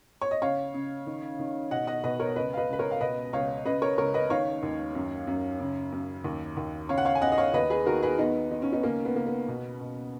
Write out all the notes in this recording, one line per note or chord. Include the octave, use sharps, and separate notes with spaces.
C#5
D#5
C#3 C#5 F5
C#3
D#3
D#3
B2 D#5 F#5
D#5 F#5
B2 B4 D#5
A#4 C#5
C#2 B4 D#5
F5
B4 D#5
C#2 B4
A#4 C#5
F5
B2 B4 D#5
C#2 C#5 F5
C#3 B4 D#5
A#4 C#5
C#2 A#4 C#5
B4 D#5
D#3 C#5 F5
D#2
F#2
F#2
C#3
F#2
D#2
D#2
C#3 C#5 F5
F#5
C#5 F5
G#5
C#3 D#5 F#5
D#5
C#5 F5
D#2 B4 D#5
G#4 B4
D#3 F#4 A#4
G#4 B4
D#3 B3 D#4
D#3 D#4
C#4
B3 D#4
C#2 A#3 C#4
B3
C#3 A#3
B3
B2
B2